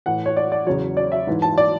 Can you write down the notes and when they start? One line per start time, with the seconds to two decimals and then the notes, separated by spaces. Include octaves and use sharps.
0.06 A2 E3 F#5
0.26 C#5
0.37 D5
0.52 D5
0.67 E2 C#3 F#3 C#5
0.97 D5
1.12 E5
1.27 G#2 E3
1.42 A5
1.58 D5